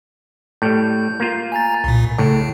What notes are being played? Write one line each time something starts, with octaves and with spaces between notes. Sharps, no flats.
A2 G3 G6
A#3 F4
G#5 A#5 A6
C2 A#2
A2 C#3